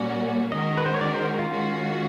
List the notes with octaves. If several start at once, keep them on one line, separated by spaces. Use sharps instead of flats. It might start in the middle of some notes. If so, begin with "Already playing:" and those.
Already playing: A#2 G3 A#3 C#4 F#4 D5
D#3 G#3 C#4 F#4 A#4 D#5
B4
C5
C#5
D5
C5
F4
D#3 G#3 C#4 F#4